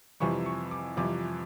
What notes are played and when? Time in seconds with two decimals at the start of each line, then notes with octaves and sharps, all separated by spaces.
0.20 F2 C3 E3 G3 C#6
0.46 C#6
0.71 D6
0.97 F2 C3 E3 G3 D6